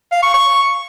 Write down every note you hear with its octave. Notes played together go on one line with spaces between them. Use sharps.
F5
C#6
C#6